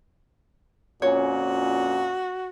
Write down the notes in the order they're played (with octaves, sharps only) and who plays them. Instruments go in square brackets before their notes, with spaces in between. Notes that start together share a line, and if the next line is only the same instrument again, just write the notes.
[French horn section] F2 A#2 C#4 [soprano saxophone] F#4 [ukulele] C#5